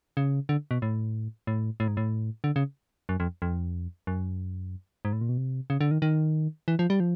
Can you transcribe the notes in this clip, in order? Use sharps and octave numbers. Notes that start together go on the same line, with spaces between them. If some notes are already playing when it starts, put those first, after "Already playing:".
C#3
D3
B2
A2
A2
A2
G#2
A2
D3
C#3
F#2
F2
F2
F#2
G#2
A2
A#2
B2
C3
C#3
D3
D#3
D#3
E3
F3
G3
F3